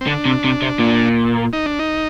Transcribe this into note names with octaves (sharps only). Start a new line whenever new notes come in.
C4
D3 D4
C3
C3
C3
A#2
D#4
D4
D#4